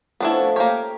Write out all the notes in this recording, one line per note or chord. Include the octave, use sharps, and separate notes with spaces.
F3 A3 B3 C#4 D4 E4
A#3 G4 A#4 C#5 G5